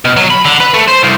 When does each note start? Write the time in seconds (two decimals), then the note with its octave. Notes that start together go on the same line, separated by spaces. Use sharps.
0.05 B2
0.17 F#3
0.30 B5
0.45 D3
0.60 B4
0.74 A3
0.88 C5
1.04 C2